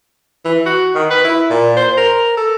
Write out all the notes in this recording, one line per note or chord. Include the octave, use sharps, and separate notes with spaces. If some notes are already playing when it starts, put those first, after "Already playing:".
E3
F#4
D#3
B4
E4
A#2
C5
A#4
A4